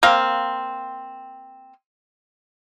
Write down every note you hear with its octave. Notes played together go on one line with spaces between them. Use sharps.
A#3 C4 F5